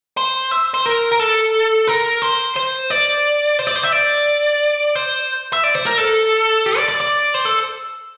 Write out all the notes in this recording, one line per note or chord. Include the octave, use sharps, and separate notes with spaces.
C5
E5
C5
A#4
A#4
A4
A#4
C5
C5
D5
C5
D5
C5
E5
D5
C5
E5
D5
C5
A#4
A4
G4
D5
D5
D5
C5
A4